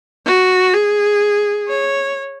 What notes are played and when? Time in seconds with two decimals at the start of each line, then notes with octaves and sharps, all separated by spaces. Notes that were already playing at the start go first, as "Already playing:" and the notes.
0.26 F#4
0.74 G#4
1.68 C#5